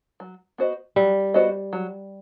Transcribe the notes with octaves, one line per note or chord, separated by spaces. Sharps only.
F#3
B3 F#4 C5 D#5
F#3 G3
B3 F#4 C5 D#5
F#3